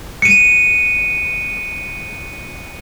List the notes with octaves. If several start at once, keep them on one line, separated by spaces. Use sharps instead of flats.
C#7 D#7